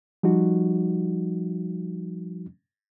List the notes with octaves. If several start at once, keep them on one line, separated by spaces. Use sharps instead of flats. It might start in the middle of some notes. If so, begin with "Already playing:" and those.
F3 G3 D#4 F#4